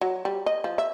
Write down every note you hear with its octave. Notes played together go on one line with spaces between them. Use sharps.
F#3
G3
D#5
F3
E5